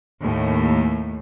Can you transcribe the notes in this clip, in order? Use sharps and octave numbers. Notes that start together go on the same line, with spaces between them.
D#2 A2